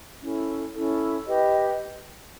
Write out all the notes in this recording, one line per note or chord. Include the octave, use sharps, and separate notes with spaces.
C#4 E4 A4
C#4 E4 A4
G4 B4 D#5